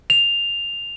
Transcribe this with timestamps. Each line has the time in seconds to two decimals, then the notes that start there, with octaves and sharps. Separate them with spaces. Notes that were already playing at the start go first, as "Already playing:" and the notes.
0.10 F7